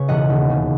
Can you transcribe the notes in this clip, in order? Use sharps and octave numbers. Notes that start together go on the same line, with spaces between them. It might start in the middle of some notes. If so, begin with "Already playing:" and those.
Already playing: C#3 B4 C#5
E1 D#5 F#5
D#2
C#3